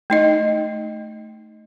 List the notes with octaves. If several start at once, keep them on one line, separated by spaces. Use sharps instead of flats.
A3 D#4 D#5